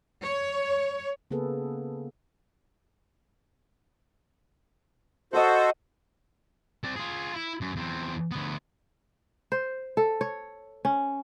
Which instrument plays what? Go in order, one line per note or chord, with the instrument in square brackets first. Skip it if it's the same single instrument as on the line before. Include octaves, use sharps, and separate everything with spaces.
[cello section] C#5
[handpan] C#3 A#3 B3 G#4 A4 B4
[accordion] F#4 A4 C5 [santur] D#5 F#5
[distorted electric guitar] C4 D5
F4 G#4
E4
F#2
E2 C4
D2 B3
[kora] C5
A4
C#5
C#4